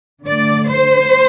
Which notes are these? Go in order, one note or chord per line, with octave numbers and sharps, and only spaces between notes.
D3 A3 D5
C5